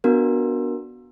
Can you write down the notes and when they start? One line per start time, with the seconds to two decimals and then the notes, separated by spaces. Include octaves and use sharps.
0.04 B3 D4 F#4 A#4